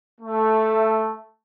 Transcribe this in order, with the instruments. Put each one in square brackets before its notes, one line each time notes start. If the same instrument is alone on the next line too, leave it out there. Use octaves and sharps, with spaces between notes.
[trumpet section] A3